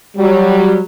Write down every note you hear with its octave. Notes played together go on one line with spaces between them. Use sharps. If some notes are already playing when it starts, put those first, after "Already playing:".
F#3 G3